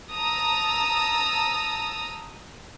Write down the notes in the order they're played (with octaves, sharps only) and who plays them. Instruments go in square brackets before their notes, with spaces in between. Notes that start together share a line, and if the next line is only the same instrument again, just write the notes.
[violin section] A5 A#5 D#6 E6